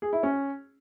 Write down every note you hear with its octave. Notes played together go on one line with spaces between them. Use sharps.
G#4
E4
C#4